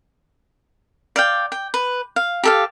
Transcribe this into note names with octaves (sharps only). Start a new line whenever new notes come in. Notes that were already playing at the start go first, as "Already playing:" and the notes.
D5 F5 G5
G5
B4
F5
G4 A4 F5